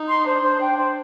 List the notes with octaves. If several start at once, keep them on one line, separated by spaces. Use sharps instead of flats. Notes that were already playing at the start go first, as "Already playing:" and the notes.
Already playing: D#4
C6
D4 C5
C5
G5
C5